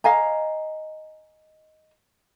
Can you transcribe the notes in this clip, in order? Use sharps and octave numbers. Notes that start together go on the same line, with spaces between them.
D#5 F5 G#5 A#5